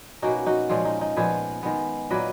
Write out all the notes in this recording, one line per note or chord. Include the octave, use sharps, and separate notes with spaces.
B2 A#3 C#4 D#4 F#4
D#4 F#4
A#2 F3 G#3 C#4 F4
D#4
D#4
A#2 F3 G#3 B3 G#4 B4
D#3 G#3 B3
A#2 F#3 A#3 B4 D#5